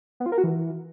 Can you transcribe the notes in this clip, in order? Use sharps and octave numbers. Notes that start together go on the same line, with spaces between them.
B3
F4
A#4
F#4
E3